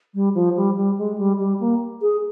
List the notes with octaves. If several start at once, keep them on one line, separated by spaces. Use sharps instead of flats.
G3
F3
G3
G3
G#3
G3
G3
A#3
G#4